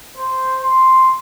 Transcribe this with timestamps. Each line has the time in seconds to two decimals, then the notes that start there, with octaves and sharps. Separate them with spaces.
0.17 C5
0.62 C6